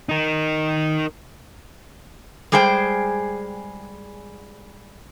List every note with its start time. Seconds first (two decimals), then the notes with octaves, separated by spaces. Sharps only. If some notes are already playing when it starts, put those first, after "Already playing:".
0.09 D#4 A#4
2.52 G3 G#3 G#4 C5 G5